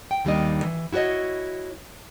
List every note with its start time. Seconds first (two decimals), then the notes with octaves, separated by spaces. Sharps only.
0.11 G5
0.25 D#2 D#3 G3 A#3 D4 D#5
0.63 E3
0.92 E4 F#4 G#4 C#5 D#5